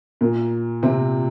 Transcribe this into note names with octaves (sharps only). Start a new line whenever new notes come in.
A#2 A#3
C3 C4